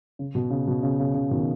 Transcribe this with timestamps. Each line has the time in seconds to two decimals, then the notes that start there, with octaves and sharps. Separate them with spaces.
0.19 C#3
0.35 B2
0.51 C#3
0.67 B2
0.83 C#3
1.00 C#3
1.14 C#3
1.31 B2 D#3